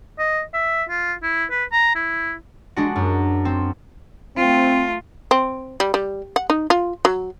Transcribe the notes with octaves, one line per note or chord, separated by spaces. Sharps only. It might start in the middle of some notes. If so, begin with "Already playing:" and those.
D#5
E5
F4
E4
B4
A#5
E4
G#3 D4 F#4
F#2
C4
A3 C4 F4
C4
G3
G3
F#5
D#4
F4
F#3